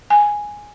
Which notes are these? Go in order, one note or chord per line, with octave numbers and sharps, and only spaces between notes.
G#5